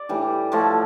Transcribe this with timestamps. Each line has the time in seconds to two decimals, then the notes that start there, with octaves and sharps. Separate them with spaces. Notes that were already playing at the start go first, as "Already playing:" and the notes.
Already playing: D5
0.09 A2 E3 G3 G4
0.52 A2 F3 A3